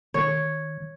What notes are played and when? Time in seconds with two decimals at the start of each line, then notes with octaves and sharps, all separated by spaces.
0.14 D#3 C#5